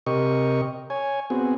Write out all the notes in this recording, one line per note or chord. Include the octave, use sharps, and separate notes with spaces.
C3 G4 A#4 D#5 C#6
C#5 G#5
B3 C4 F#4 G#4